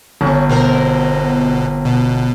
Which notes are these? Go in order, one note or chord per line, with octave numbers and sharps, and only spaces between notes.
G1 C#4
B2 C4 A#4
B2